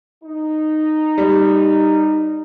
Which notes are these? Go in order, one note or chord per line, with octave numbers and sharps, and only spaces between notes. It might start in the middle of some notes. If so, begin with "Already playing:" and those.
D#4
G3